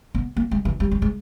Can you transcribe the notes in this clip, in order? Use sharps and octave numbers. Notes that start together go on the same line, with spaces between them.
B3
A#3
G#3
E3
G3
G3
G#3